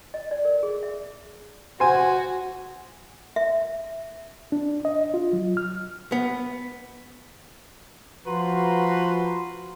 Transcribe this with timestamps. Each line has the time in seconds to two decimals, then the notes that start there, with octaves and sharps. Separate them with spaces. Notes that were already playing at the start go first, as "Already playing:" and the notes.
0.14 D#5
0.31 D5
0.45 A#4
0.63 G#4
0.83 E5
1.80 F#4 C5 G#5
3.36 E5
4.52 D4
4.85 D#5
5.14 F4
5.33 F#3
5.57 F6
6.12 B3
8.26 F3 F#4 B4 A#5 C6